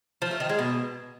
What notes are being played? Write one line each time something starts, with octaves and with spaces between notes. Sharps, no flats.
F3
A3
D#3
G#3
B2